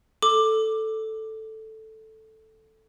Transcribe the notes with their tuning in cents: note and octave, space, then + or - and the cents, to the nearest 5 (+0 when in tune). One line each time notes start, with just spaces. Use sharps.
A4 +0 D6 +10